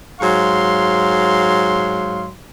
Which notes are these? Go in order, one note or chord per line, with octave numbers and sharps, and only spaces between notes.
G#2 F#3 F5 C6